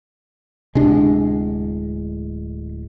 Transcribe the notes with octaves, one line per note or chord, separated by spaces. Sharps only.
D1 C3 G#3 D4